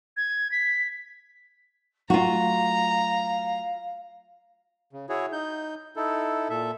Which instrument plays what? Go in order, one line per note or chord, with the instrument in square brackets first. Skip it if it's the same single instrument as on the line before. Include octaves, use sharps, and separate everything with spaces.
[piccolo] G#6
B6
[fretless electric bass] F#3 A3 [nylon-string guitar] F4 F#4 [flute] F5 [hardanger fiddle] A#5
[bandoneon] C#3
E4 F#4 G#4 C#5
D#4 G6
D#4 E4 A4
A#2 A4 E5